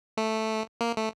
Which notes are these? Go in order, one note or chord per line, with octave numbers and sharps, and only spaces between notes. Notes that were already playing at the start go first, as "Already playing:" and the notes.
A3
A#3
A3